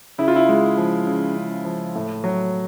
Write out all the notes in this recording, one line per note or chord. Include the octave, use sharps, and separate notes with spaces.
C#3 E4
F4
E4
G#3
F3
C#3
C#3
F3
A2
F#3